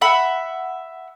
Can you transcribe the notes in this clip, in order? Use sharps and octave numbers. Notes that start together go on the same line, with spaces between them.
E5 F#5 B5